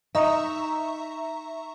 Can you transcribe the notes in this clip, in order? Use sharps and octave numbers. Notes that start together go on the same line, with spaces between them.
D#4 E5 A#5 C#6